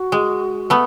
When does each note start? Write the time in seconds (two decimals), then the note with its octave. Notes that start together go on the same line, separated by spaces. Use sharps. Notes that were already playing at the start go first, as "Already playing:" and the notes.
Already playing: F#4
0.12 G#3
0.70 A3 B3